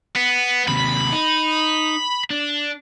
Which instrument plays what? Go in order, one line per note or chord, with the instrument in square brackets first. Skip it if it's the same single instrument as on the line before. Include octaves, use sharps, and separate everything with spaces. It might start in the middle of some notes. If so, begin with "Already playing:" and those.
[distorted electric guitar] B3
[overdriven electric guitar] D#2 C3 [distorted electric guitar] B5
[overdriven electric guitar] D#4
D4